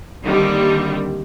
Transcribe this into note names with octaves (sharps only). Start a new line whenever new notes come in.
D3 D#3 G3 A#3 C4